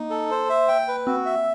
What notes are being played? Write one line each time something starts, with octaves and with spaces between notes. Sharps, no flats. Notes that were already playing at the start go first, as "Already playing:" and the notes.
Already playing: A#3 D#4
A4
C5
E5
G5
B4
C4 F#4
E5